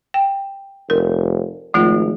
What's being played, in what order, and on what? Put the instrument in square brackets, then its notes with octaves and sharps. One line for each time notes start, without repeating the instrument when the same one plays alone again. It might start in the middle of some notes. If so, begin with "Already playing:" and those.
[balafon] G5
[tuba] F1 [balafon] A#4
[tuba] G#1 [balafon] F3 A3 F4